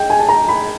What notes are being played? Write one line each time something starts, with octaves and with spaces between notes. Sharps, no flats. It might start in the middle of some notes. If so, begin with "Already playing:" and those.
Already playing: D#5 G5
G#5
A5
A#5
B5